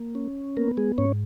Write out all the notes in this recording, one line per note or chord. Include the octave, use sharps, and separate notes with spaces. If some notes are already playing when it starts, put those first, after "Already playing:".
Already playing: A#3
C#4
A#3 B3 A#4
G#3 G#4
G#2 C#4 C#5